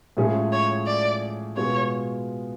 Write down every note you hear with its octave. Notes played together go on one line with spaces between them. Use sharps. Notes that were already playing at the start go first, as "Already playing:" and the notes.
A2 F3 G#3 C#4 G#4
C#5
D5
B2 G#3 B3 F4 C#5